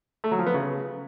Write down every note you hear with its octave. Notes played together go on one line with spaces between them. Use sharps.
A3
F#3
F3
B3
C#3